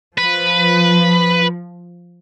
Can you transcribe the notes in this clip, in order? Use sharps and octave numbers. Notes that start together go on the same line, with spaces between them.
F3 B4